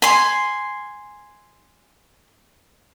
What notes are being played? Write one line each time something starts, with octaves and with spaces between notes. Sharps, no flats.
G#5 C6